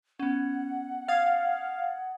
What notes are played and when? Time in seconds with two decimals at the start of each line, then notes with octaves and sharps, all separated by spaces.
0.19 B3 C#4 F#5
1.08 F5 D#6 G#6 A6